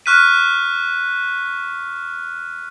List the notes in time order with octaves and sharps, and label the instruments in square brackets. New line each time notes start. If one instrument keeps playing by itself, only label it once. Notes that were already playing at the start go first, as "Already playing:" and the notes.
[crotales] C#6 F6 F#6 B6 D#7